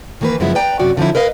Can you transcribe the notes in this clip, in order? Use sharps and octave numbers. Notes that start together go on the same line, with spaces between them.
D#3 E3 A#3 G#4 B4
F#2 C#3 F3 G#3 B3 E4
B4 D5 G5 A#5
F#2 C3 B3 F#4 D5
D3 F3 C#4 D#4 E4
A#4 B4 D#5 F5